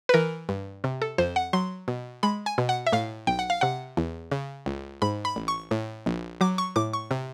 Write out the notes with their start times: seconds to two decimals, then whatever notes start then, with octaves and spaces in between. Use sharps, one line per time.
0.09 B4
0.14 E3 A#4
0.49 G2
0.84 C3
1.02 A4
1.18 F2 C5
1.36 F#5
1.53 F#3 C6
1.88 B2
2.23 G#3 B5
2.46 G#5
2.58 B2
2.69 F#5
2.87 E5
2.92 A2 F5
3.27 B1 G5
3.39 F#5
3.50 F5
3.61 C3 F#5
3.97 E2
4.31 C#3
4.66 C#2
5.02 G#2 B5
5.25 B5
5.36 A1
5.48 C#6
5.71 A2
6.06 A#1
6.41 F#3 D6
6.58 C#6
6.76 A2 D6
6.93 C#6
7.11 C3